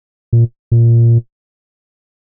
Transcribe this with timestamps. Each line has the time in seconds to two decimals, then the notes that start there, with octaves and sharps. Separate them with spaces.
0.33 A#2
0.72 A#2